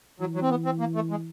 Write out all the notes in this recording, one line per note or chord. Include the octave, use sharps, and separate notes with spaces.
E3 F#3
F#3
C4
B3
C4
A#3
A3
G#3